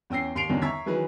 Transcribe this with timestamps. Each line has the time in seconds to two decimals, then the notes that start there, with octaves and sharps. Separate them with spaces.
0.10 E2 C#4 G5 E6 A#6 C7
0.35 D#2 C6 C7 D7 F7
0.49 E2 G2 D3 D#3 C#4 D4
0.62 E5 A#5 C#6 E6 G#6 B6
0.86 D#3 E3 F#3 G#4 B4